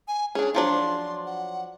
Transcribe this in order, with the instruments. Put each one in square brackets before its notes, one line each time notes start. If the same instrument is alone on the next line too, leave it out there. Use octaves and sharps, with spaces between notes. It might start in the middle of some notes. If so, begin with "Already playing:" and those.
[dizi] G#5
[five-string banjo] C#4 D4 [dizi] G#4
[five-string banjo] F3 F#3 D4 [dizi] C6
[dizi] F#5